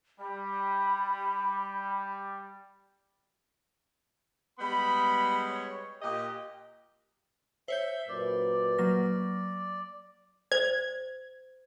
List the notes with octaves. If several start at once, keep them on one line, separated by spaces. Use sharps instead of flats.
G3 B5
G3 G#3 B3 B5
C#5
A#2 G4 D#5
C5 C#5 E5 G6
F#2 A#2 B4 D5
F#3 A#3 A#6
C5 G#6